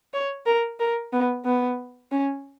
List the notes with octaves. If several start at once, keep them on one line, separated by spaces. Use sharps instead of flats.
C#5
A#4
A#4
B3
B3
C#4